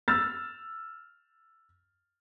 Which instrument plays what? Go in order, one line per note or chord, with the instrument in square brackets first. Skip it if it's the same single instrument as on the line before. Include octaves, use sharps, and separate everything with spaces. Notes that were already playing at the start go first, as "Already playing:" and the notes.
[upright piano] E6 F6 A6